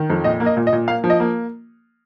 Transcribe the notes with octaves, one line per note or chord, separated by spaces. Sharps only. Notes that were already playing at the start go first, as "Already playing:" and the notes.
Already playing: D#3
F2
A#2 D#5
A#3
D#5
A#2
D#5
A#2
A#3 F5
F3
D#5
A#3